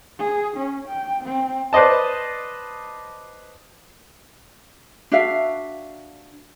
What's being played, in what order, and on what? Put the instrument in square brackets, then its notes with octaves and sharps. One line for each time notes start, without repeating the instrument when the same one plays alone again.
[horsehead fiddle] G#4
C#4
G5
C4
[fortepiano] B4 C5 D5 D#5 A5
[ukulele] D4 F#4 E5 F5